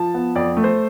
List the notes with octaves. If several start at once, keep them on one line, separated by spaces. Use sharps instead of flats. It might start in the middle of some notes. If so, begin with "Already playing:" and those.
Already playing: F3 A5
B3
F2 D5
A3
C5